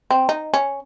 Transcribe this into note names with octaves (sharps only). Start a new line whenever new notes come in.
C4
D#4
C#4